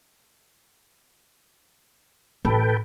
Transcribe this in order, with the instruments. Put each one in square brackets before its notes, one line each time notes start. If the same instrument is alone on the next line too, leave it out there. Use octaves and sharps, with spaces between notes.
[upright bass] A1 [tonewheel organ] A4 B4 G5